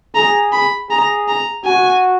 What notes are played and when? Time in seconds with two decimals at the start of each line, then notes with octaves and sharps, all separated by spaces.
0.15 G#4 A#5
0.53 B5
0.90 G#4 A#5
1.28 A#5
1.65 F#4 G#5